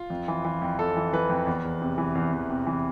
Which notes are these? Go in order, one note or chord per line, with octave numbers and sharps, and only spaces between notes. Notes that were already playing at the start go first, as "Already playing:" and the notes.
Already playing: F4
F2
E3
E3
F2
F2 A4
E3
E3 B4
F2
E2
E2
C3
E3
E2
E2
C3
E3